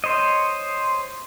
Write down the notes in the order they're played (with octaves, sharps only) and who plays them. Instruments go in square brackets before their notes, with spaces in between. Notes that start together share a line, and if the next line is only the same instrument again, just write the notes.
[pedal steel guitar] C5 C#5 D#5